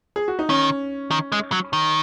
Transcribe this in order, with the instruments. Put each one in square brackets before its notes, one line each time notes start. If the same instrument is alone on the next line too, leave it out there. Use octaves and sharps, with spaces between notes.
[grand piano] G#4
F#4
D#4
[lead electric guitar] D#3 [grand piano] C#4
[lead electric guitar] D#3
G#3
F#3
D#3